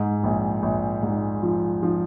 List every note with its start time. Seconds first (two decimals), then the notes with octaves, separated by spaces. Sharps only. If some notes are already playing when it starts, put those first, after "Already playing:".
Already playing: G#2
0.23 A#1
0.63 A#1
1.03 G#2
1.43 F3
1.83 F3